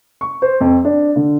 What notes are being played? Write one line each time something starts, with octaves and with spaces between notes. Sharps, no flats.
C#6
C5
F2
D4
D3